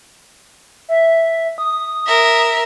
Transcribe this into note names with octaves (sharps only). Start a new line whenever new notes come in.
E5
D#6
A#4 E5